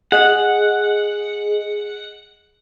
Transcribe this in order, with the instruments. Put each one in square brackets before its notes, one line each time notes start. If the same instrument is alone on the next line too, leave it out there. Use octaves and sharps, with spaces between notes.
[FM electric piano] G#4 D#5 [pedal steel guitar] F#5